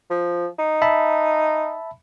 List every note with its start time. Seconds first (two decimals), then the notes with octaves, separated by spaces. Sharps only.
0.10 F3
0.59 D#4
0.82 E5 A5 B5